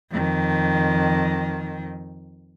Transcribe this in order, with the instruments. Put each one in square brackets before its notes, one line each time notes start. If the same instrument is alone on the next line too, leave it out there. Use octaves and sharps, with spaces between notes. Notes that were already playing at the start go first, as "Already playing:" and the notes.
[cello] F2 D#3